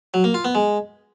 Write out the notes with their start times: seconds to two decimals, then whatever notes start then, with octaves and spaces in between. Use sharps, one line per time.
0.14 F#3
0.24 A#3
0.34 F4
0.45 B3
0.55 G#3